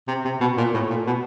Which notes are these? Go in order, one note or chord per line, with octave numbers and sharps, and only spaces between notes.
C3
C3
B2
A#2
A2
A#2
B2